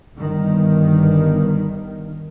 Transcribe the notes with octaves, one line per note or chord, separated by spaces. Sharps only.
G1 G2 D#3